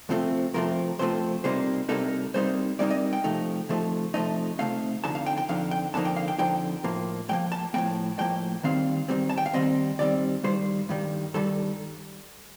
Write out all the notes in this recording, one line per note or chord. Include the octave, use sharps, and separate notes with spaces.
F2 C3 F3 A3 C4
F2 C3 F3 A3 C4 A#4
F2 C3 F3 A3 C4 C5
C2 C3 G3 A#3 D#4 C5
C2 C3 G3 A#3 D#4 A4
C2 C3 G3 A#3 D#4 C5
C2 C3 G3 A#3 D#4 D5
D#5
G5
C3 F3 A3 D#4
C3 F3 A3 D#4
C3 F3 A3 D#4 D#5
C3 F3 A3 D#4 F5
F2 D3 F3 D#4 A5
F5
G5
G5
F2 D3 F3 D#4 F5
G5
F2 D3 F3 A#3 D#4 A5
G5
F5
G5
F2 D3 F3 D#4 G5
A2 F3 A#3
A2 F3 A#3 G5
A5
A2 F3 A#3 G5
A2 F3 A#3 G5
D#2 D#3 G3 C4 F5
D#2 D#3 G3 C4
A5
G5
F5
D#2 D#3 G3 C4 D#5
D#2 D#3 G3 C4 D5
G2 D#3 G3 C5
G2 D#3 G3
G2 D#3 G3 A4